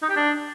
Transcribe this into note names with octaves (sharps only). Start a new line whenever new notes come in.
D#4
G4
D4